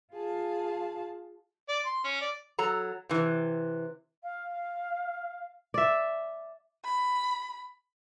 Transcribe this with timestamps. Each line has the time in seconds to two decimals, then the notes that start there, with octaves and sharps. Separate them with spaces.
0.13 F4 G#4 F5 A5
1.69 D5
1.85 C6
2.04 C#4
2.21 D5
2.59 F#3 A4 A#5
3.09 C3 E3
4.23 F5
5.74 D5 E5
6.84 B5